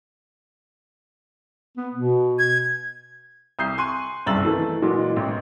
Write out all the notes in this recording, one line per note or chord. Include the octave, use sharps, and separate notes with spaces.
B3
B2
G#6
C2 D#6 G6 C7
G#5 C6 C#6 F#6 D#7
F#1 C2 G2 E6 A6 F#7
D#3 E3 A3
A#2 E3 F#3 G#3
A1 G#2